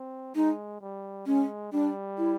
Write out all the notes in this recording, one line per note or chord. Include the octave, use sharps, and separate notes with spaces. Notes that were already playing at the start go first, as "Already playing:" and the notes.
Already playing: C4
G#3 D#4
G3
G#3 C#4
G3 D4
E4